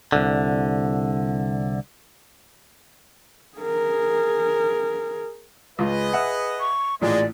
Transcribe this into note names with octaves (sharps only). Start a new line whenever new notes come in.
C2 D3
G#4 A#4
C#2 F4 G#4 B4 D#5
E5 F#5
C#6
A1 A#2 G#3 D5